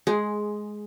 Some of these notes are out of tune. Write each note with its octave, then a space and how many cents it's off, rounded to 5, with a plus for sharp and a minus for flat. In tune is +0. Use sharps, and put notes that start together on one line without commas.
G#3 +10 G#4 +0